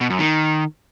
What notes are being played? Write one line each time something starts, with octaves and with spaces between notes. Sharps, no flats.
B2
F#2
D#3